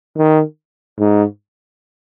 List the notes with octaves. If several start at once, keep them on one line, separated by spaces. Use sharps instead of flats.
D#3
G#2